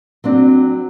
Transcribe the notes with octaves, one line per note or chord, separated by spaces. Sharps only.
F#3 C4 D4